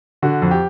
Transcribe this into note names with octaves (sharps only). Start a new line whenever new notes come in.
D3 F#4
F2
G4